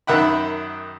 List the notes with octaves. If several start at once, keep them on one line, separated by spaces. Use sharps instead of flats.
F#2 D#3 E5 F#5 B5